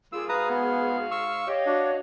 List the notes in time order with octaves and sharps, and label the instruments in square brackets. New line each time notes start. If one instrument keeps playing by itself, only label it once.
[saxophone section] G3 A#3 F4 [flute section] G#4 [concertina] E6
[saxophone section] G#2 F#4 F5 [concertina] B4 A#5 D#6
[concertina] B3
C#6 E6
[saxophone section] G4 [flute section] C#5 D#5 F5
[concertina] D4 [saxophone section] F#4